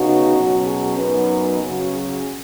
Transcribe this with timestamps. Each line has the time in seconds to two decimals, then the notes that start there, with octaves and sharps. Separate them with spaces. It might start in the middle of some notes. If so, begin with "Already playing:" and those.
Already playing: C#3 B3 D#4 F#4
0.34 B2 F#3 C#4
0.66 G#4
0.97 F#2 F#3 B3 D#4 B4
1.60 C#3 F#3 C#4 F#4
1.91 G#4